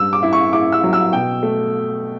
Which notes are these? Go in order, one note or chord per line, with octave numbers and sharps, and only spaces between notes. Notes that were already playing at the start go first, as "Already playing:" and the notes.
Already playing: G2 E6
D6
E4
C#6
E4 D6
E6
F#3
E6
B2 G5
A3